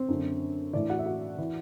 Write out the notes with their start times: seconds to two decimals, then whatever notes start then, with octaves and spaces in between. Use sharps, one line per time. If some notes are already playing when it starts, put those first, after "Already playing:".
Already playing: C4 C5
0.08 F#2 D3
0.73 A2 E3 D4 D5
0.90 F#4 F#5
0.99 E5
1.06 F#4 F#5
1.38 E3